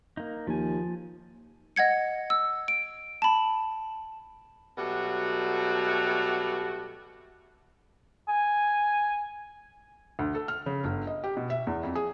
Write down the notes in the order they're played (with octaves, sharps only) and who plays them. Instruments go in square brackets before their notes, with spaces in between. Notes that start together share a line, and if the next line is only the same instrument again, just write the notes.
[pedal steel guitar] A#3 D#4
[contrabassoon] D#2 [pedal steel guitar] F3 G#5
[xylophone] D#5 F#5 G#6 C#7
E6
D7
A5 B5
[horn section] B2 F#3 G3 A3 F#4
[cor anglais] G#5
[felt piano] D2
A4
F6
C#3
G1
D#5
G4
B2
E5
E2
F2
G#4